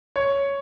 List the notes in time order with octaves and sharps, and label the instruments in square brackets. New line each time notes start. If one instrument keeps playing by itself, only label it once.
[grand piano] C#5